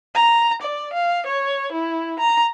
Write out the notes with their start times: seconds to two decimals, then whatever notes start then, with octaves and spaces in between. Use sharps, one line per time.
0.16 A#5
0.62 D5
0.93 F5
1.26 C#5
1.72 E4
2.20 A#5